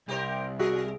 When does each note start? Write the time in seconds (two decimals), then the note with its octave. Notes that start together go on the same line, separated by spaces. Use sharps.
0.08 C2 G4 A#4 C5
0.59 G3 F#4 G#4 A#4 E5